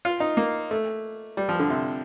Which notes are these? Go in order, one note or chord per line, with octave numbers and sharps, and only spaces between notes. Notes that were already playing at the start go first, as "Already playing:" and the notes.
F4
D#4
A#3
A3
G3
F3
D3
C3